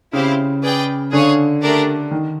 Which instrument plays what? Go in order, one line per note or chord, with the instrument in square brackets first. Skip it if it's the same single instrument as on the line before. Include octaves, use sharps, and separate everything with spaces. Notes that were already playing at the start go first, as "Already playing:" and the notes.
[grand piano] C#3 [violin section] C4 E4 G4 C5 F5
[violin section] G#4 B4 D5 G5
[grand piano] D3 [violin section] G#4 C#5 F5
[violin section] A3 D4 G4 A#4 D5
[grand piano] D#3